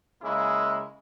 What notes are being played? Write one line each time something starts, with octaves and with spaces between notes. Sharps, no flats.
C#3 G#3 A#3 E4